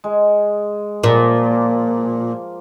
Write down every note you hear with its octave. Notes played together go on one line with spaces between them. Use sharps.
G#3
A#2 F3 A#3